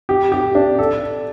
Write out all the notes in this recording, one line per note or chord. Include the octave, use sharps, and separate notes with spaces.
G4
G4
D4
A4